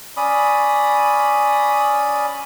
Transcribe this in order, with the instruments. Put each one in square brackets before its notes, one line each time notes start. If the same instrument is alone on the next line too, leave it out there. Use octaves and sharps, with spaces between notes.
[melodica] C#4 D5 B5 D#6